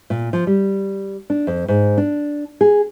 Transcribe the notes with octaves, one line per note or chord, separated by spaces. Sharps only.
A#2
F3
G3
D4
F2
G#2
D4
G#4